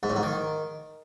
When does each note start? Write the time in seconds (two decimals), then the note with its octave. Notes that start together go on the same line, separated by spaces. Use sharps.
0.03 G#2
0.10 A2
0.16 G#2
0.23 D#3